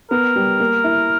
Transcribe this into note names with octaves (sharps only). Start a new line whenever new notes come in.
B3 A#4
G3
A#3
E4